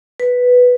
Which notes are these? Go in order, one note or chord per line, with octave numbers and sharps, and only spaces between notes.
B4